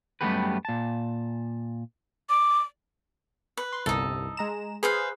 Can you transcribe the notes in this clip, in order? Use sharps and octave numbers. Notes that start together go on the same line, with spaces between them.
F#2 G3 A3 B3 G4 B4
A#2 A5
D6
B4
C6
G1 C2 D#4 A4
G#3 A#5 E7
G#4 B4 C5 F5